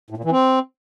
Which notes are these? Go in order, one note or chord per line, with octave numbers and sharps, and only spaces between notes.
A2
A#2
E3
C4